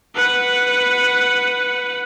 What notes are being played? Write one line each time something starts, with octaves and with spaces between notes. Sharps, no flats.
B4 F#5